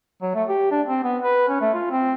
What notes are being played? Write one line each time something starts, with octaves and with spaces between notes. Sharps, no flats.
F#3
A3
G4
D4
C4
B3
B4
C#4
A3
F4
C4